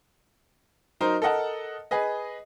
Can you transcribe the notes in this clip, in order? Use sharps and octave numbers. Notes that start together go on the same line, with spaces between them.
F#3 D#4 A#4 C5
A4 A#4 D#5 F#5 A5
G#4 B4 D#5